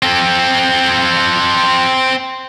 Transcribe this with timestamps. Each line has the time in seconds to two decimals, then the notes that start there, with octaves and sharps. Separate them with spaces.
0.03 C4 A4